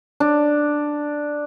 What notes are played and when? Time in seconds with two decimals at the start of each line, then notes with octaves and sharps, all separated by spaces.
0.20 D4